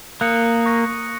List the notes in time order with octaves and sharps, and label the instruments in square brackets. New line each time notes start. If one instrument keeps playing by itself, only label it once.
[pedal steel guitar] A#3 [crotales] D#6 F#6 C#7
[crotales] C#6 F#6 A#6